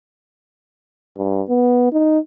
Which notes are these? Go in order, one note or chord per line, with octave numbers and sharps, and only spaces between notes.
G2
B3
D#4